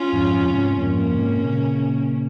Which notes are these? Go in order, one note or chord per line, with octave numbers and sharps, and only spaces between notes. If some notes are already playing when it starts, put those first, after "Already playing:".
Already playing: C#4 F4
F2 G#2
G#2 C3
F2 G#2 A#3 C#4
G#2 C3
A#2 C#3